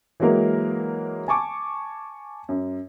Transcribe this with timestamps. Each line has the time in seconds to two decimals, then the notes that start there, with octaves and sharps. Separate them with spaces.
0.20 E3 F#3 G#3 A#3 A#4
1.28 G#5 A5 C#6 D6
2.49 F#2